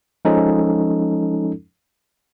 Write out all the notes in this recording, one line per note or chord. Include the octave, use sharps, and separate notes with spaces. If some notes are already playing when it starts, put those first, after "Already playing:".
F3 G#3 C#4 D#4 A4